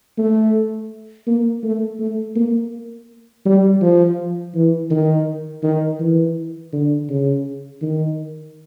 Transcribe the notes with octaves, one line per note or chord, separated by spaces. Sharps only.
A3
A#3
A3
A3
A#3
G3
F3
E3
D#3
D#3
E3
D3
C#3
D#3